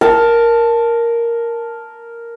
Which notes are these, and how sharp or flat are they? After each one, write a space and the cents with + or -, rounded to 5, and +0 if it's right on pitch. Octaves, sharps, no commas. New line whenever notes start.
A#4 +0 A5 +0